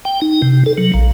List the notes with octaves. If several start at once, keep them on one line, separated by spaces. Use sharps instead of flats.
G5
D#4
C3
A4
F#3
A#1